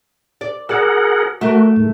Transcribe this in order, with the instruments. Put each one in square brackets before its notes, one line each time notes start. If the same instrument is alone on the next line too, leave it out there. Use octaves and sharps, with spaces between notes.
[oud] D5
[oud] F#4 D5 [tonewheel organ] G#4 A#4 F#5
[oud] A3 A#4 [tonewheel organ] F#4
[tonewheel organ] G#2